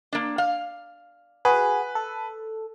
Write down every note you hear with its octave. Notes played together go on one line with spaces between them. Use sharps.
A#3 D4
F5
F#4 G#4 B4
A4